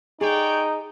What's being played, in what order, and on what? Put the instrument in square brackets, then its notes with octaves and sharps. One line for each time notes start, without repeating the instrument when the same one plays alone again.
[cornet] D#4 [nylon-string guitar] G#4 [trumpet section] C#5 D5 G5